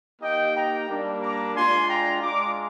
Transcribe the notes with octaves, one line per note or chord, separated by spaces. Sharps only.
A#3 D#4 G4 D#5 G5
G5 A#5
G3 A#3 D4
A#5 D6
G#3 D4 F4 G#5 C6
G5 A#5
G#3 D4 F4 A#5 D6